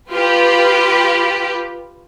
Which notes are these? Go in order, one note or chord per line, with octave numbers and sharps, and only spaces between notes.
F4 G4 B4